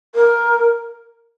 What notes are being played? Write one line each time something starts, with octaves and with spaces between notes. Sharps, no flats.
A#4